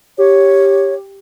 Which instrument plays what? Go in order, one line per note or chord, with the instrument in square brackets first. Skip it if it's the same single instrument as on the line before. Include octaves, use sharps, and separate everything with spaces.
[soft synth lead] G4 [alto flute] C#5